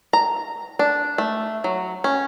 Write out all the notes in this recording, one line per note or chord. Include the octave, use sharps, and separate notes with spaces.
A#5
D4
A3
F#3
C#4